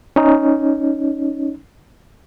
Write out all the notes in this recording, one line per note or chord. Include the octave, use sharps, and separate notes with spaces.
C#4 D#4